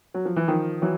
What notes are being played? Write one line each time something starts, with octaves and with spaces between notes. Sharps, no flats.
F#3
F3
E3
D#3 F3
E3 F#3